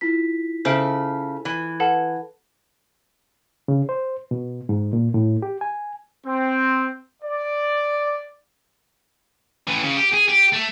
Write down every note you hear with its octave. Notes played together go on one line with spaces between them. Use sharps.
E4 F4 B6
C#3 A4 C5 E5 D7
E3
A4 B4 F#5 A5
C#3
C5
B2
G#2
A#2
A2
G4
G#5
C4
D5
A2 E3
C#3
G4
G#4
G4
A3